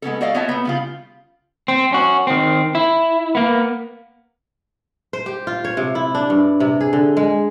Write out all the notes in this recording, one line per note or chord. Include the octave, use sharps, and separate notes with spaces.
G#3 B3 C#4 A4
F#4 A4 D5 D#5 F5
B3 F4 C#5 D#5 E5 A5
A3 B3
C#3 G3 F4
C4
C#4 F#4
D#3 C4
E4
A#3 B3
C5
G4
F4
C#5
C3
E4
D4
G2
C3
G#4
D3
G#3